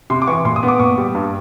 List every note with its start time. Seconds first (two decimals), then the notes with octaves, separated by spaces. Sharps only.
0.10 C3 C6
0.22 D6
0.27 E3 C#6
0.45 A#2 C6
0.56 D#6
0.63 B3
0.68 D6
0.80 A#2 C#6
0.98 G3
1.15 G2